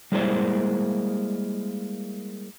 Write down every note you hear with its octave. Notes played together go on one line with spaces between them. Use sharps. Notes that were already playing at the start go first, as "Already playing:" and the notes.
G3 G#3 A#3 E4 C5 D5